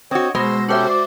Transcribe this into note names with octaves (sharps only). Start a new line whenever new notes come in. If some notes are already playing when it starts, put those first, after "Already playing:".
C4 F#4 C#5 D#5
B2 G#3 C5 C6 E6 A#6
C#4 F#4 G4 A4 C5 E5
D5